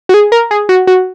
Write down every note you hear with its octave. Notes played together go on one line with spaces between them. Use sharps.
F#4
G#4
A#4
G#4
F#4
F#4